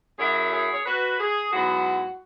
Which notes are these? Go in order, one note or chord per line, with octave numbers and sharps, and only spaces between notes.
F#2 F#3 E4 G#4 C#5
G#4 C#5
C#5
F#4 B4
G#4
G#2 F#3 B3 E4 F#4